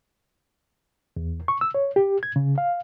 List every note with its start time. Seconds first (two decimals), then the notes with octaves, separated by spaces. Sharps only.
1.17 E2
1.48 C#6
1.61 E6
1.75 C#5
1.96 G4
2.23 G#6
2.36 C#3
2.58 F5